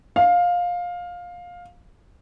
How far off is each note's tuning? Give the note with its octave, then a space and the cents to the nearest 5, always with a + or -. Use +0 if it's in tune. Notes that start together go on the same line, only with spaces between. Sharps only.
F5 +15